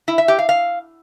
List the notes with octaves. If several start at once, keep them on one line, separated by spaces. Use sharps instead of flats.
E4
E5
G4
F5
F5